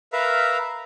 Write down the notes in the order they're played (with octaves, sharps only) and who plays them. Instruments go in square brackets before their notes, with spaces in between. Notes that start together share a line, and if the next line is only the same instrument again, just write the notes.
[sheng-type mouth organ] A#4 B4 E5 F5 A#5